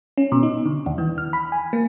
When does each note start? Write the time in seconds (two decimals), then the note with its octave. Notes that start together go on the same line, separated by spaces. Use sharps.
0.18 C#4
0.32 B2
0.43 D#4
0.66 D3
0.86 D#2
0.98 E3
1.18 F6
1.33 B5
1.52 G#5
1.73 A#3